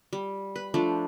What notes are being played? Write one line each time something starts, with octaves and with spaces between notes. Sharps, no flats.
G3
B4
F3 A3 D4